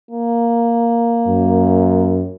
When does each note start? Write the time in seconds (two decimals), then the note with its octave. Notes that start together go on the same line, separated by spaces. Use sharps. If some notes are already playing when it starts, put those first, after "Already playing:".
0.11 A#3
1.28 F#2